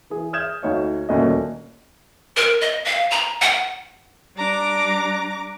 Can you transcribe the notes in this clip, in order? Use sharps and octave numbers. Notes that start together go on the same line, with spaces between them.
E3 G#4
D#6 F6 G6 G#6 E7
D2 D#4 C#5 F5
D#1 D2 A#2 C#4 A4 D#5
A#4
D#5
F5
A#5
F#5
G3 D4 A#5 D6